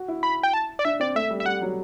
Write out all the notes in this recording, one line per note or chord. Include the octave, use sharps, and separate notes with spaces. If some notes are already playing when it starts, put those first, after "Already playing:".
Already playing: F#4
E4
B5
G5
A5
D5
D4 E5
C4 D5
A3 E5
G3
E5
G3 F#5
F#3